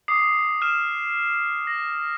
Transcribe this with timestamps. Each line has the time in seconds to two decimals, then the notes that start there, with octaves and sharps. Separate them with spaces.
0.08 D6 D#6 C7
0.62 F6 E7
1.67 A#6